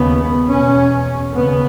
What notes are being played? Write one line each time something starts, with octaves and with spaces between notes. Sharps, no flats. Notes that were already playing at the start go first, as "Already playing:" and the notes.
Already playing: D#2 C#3 B3
E2 B2 C#4
D#2 C#3 B3